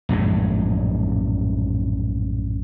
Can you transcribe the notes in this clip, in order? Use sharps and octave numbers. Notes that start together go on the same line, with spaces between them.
A#1 F#2 A2 G#3